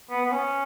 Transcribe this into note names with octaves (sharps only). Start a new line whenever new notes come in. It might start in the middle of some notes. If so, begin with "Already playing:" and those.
B3
B3
C#4